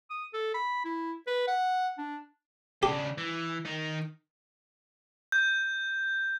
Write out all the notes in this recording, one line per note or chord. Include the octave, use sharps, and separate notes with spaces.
D#6
A4
B5
E4
B4
F#5
D4
C#3 D4 G4
E3
D#3 D#4
G6